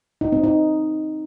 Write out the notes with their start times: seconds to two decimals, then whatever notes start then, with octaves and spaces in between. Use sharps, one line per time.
0.21 D#4
0.32 C4
0.44 D#4